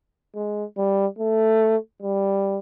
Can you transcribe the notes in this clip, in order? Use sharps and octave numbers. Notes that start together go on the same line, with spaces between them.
G#3
G3
A3
G3